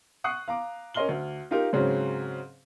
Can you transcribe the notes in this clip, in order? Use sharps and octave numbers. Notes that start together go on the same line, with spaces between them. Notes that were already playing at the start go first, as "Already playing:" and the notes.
F#5 C#6 D#6 F#6 C7
F5 A#5 D6
C#4 A#4 D#5 C6 F6 G7
D2
D#4 F4 G4 A#4
G#2 C#3 F#3 C4 C#4